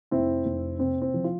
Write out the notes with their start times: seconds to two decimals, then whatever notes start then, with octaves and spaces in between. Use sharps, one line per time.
0.11 F1 C4 E4
0.46 F1
0.79 C3 C4
1.02 C4
1.14 F3
1.24 F4